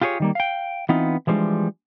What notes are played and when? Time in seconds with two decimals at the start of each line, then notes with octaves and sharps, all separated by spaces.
0.01 F4 G4 G#4 B4 C#5
0.20 D#3 G3 A#3
0.35 F5 G5
0.89 E3 B3 C4 D#4 F4
1.27 E3 F3 G3 G#3 D4